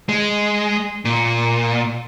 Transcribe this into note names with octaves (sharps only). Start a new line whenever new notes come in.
G#3
A#2